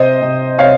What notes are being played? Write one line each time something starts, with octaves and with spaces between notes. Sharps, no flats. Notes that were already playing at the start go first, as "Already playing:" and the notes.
Already playing: C3 C5 D#5
C3
C3 C#5 F5